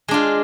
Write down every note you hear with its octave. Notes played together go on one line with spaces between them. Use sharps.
G#3 D4 F4